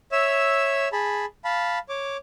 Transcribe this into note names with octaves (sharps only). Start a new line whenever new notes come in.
C#5 E5 E6
G#4 A5 B5
F5 A5 B5
C#5 D6